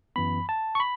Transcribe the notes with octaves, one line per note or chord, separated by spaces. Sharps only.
F#2 E3 B3 B5
A5
C#6
B5